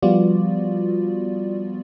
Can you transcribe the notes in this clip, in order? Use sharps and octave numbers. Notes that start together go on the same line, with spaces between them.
F3 G3 B3 F4 F#4 D5